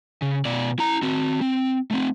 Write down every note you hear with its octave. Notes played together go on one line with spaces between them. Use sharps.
C#3
B2 D5
E4 A#5
C4 F#4
C4
A3 C4